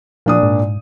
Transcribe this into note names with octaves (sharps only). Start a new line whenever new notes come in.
A#2 F3 D4 D#6
G#2